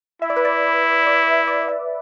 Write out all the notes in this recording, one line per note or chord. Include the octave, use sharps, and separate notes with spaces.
E4 E5
D5
B4
D5
D5
E5
D5
E5